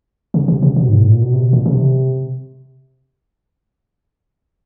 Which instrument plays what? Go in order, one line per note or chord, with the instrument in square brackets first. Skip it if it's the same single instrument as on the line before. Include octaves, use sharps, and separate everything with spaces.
[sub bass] C#3
C3
C3
B2
G#2
A2
A#2
B2
C3
A#2
C#3
C3